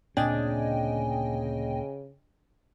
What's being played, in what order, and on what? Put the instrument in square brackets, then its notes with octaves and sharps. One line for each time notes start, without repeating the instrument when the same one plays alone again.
[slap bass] D2 A#2 C4 [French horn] C#3 [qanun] D4 [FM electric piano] D#5 G5 G#5